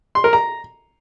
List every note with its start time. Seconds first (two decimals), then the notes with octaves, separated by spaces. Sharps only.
0.15 C6
0.24 A#4
0.33 A#5